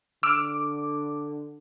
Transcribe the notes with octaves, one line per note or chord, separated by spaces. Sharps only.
D3 D6 E6 F6 D7